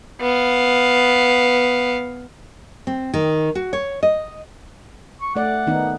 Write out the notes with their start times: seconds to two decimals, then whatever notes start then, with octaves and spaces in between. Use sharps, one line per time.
0.21 B3 F5
2.87 C4
3.14 D#3
3.55 F#4
3.73 C#5
4.03 D#5
5.21 C#6
5.36 A3 D5 F#5
5.67 D#3 B3 D#4